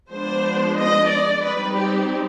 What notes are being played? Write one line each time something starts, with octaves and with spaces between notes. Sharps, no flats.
F3 G#3 B3 D4 C5
D#5
D5
G3 C4 D#4 B4
G4